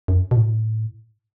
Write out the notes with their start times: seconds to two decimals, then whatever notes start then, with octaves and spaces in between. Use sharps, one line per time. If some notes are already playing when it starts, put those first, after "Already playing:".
0.08 F#2
0.31 B2
0.36 A2